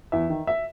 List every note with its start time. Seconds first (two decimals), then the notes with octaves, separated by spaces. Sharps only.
0.12 E2 E5
0.30 D#3
0.47 E5